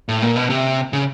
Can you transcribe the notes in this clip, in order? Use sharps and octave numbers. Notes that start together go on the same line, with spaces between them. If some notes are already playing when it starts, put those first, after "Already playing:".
A2
A#2
B2
C3
C#3